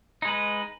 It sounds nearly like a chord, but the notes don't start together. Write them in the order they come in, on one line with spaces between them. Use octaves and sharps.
D#4 G#3 B4